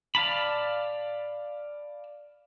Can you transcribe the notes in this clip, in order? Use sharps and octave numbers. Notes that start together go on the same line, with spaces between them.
D5 F5 A5 B5